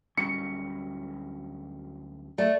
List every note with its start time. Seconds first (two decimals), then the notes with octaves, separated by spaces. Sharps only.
0.18 D1 G3 C#4 C#7
2.38 A3 D5